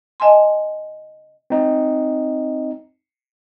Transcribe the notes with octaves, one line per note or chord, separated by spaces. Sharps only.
D#5 E5 G#5 A5 C6
C4 D#4